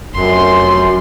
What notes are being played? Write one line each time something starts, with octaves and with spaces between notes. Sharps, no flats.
F1 F#2 C6